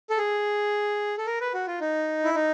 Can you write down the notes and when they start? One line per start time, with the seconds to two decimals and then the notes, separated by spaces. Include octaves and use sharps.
0.10 A4
0.18 G#4
1.18 A4
1.26 A#4
1.40 B4
1.54 F#4
1.67 F4
1.81 D#4
2.24 E4
2.35 D#4